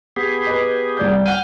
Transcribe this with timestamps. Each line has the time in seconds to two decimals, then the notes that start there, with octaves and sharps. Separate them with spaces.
0.16 B3 G4 G#4
0.47 B4 D#5
0.97 C2 D5 G6
1.26 F#5 F6 G6 D#7